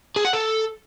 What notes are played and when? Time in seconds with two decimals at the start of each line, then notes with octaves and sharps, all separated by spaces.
0.16 G#4
0.25 F#5
0.33 A4